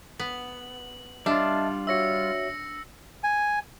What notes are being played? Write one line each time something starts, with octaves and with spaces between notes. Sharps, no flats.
B3 F#7
G3 D4 F4 D#5 E5 A5
F#4 C#5 E5 E6 A#6 C#7
G#5